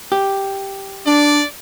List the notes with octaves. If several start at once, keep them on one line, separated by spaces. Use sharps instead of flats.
G4
D4 D5